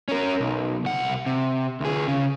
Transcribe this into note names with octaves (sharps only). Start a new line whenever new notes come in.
C#4 A#4
B1
C2 F#5
C3
D2 G#4
C#3